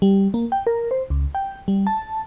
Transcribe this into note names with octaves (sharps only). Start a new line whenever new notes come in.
G3
A#3
G5
A#4
C5
C#2
G5
G3
A5